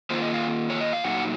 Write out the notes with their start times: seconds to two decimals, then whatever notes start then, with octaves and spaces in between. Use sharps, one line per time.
0.10 D#3 A#3 F4 C5
0.22 D#5
0.34 F5
0.70 C#5
0.81 D#5
0.93 F5
1.04 A#2 F#3 A#3 D#4 F#5